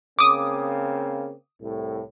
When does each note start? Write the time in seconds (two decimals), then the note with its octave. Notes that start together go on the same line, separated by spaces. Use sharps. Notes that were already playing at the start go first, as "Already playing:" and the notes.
0.19 C#3 A#3 C4 D6 D#6
1.61 C2 A2